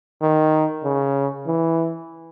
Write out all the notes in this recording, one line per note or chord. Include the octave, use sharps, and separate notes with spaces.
D#3
C#3
E3